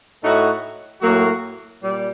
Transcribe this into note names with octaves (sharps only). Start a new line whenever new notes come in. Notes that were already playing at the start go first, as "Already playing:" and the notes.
A2 A3 D#4 F#4
A2 F#3 A#3 F#4
A#2 G3